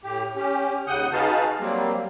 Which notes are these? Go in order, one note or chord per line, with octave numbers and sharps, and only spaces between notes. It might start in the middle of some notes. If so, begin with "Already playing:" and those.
A2 G4
C#4 G4
D#2 C#3 F#5 D#6 G6
D#4 F#4 G#4 B4 F5 A5
F#3 G3 A#3 C4